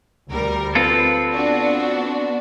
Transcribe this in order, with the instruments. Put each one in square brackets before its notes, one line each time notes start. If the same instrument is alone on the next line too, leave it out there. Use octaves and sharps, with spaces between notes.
[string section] D2 G3 A#4
[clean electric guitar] C4 F4 A4 [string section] B4
[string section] B3 D4 F#4